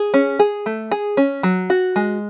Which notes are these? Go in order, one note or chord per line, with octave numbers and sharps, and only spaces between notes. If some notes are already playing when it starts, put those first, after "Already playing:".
Already playing: G#4
C#4
G#4
A3
G#4
C#4
F#3
F#4
G#3